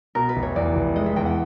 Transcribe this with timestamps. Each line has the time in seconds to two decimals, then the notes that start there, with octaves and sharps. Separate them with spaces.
0.15 B2 A#4
0.29 B4
0.36 F1
0.43 C#5
0.56 E2 D5
0.76 F1
0.96 G#3 D#5
1.06 E5
1.16 E2 G5
1.26 F#5